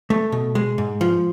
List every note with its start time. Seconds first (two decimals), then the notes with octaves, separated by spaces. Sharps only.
0.10 A3
0.32 B2
0.55 G#3
0.78 G#2
1.01 F3